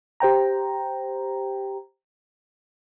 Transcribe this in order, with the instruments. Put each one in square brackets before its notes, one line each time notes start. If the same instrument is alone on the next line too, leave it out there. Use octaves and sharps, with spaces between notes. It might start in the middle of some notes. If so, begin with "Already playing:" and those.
[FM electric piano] G4 C5 G5 A#5